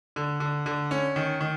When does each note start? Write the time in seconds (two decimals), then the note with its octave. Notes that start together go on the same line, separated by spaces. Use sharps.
0.16 D3
0.40 D3
0.66 D3
0.91 C#4
1.16 D#3
1.41 D#3